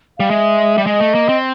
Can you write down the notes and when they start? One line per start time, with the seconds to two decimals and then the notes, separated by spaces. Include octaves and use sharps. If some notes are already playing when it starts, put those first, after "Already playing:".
0.18 G3 F5
0.30 G#3 E5
0.78 G3
0.87 G#3 D#5
1.00 A3
1.15 A#3
1.29 C4